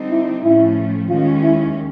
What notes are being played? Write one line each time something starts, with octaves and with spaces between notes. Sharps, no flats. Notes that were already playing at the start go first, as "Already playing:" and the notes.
Already playing: D3 G3 C4 D#4
E4
A2 F3 A3 C#4 E4
D#2 D#3 G#3 C#4 F4
E4